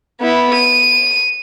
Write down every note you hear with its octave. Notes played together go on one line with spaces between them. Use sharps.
B3 E4
D#7